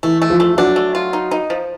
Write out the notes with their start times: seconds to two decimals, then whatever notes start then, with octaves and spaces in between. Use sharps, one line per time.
0.03 E3 A3 E4
0.22 A3
0.30 F3 F4
0.40 A3
0.54 F4
0.58 F#3 D4 F#4
0.76 A3
0.95 F4
1.13 D#4
1.31 D#4
1.50 F3